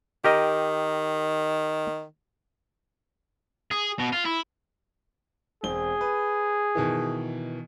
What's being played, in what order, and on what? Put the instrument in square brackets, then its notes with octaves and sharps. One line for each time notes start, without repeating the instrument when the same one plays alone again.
[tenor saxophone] D#3 [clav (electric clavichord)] G4 A#4 D#5
[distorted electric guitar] G#4
B2
F4
E4
[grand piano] E1 C4 G7 [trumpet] G#4
[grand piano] B4
B2 D#3 E3